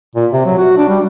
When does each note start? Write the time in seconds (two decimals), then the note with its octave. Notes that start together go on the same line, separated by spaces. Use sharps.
0.16 A#2
0.33 C3
0.46 F#3
0.58 F#4
0.77 D4
0.89 G3